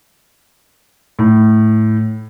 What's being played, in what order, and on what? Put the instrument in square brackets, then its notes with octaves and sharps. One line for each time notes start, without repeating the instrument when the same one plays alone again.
[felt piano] A2